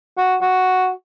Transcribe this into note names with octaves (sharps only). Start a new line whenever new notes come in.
F#4
F#4